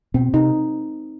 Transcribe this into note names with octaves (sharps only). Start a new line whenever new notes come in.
B2 C4
C3 D#4